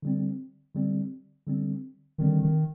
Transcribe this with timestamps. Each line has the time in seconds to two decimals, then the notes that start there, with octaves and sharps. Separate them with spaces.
0.02 D3 G3 C4
0.75 D3 G3 C4
1.47 D3 G3 C4
2.18 D3 D#3 G3 C4
2.43 D#3